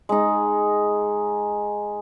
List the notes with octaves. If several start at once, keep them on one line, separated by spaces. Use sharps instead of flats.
G#3 D#4